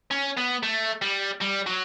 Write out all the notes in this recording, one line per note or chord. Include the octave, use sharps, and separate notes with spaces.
C#4
B3
A3
G3
G3
F#3